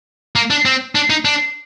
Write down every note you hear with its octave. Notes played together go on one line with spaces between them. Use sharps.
A#3
D4
C4
D4
D#4
D4